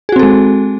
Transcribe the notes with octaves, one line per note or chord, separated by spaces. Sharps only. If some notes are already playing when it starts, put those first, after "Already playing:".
G#3 C4 F#4 G#4 A4